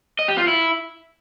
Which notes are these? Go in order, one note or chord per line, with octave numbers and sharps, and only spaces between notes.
D#5
G4
F4
E4